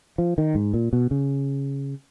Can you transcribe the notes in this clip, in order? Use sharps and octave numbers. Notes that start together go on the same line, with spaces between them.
F3
D#3
G#2
A#2
B2
C#3